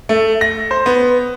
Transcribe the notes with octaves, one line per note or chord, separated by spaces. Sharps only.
A3
A#6
C5
B3